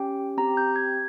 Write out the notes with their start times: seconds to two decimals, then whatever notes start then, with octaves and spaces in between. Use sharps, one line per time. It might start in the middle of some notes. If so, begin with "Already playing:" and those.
Already playing: C#4 G4 G5
0.37 C4 G4 A#5
0.57 G6
0.76 G#6